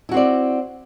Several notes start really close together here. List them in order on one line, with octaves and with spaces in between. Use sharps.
E4 F#4 C4 D5